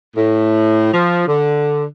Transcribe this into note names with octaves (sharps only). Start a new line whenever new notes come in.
A2
F3
D3